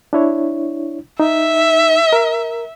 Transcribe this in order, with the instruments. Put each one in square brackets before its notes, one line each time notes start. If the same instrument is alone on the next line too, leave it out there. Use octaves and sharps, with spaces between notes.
[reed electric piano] D4 E4 C#5
[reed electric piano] D#4 [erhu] E5
[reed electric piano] A#4